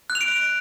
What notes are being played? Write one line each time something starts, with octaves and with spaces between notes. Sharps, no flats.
F#6
F7
D7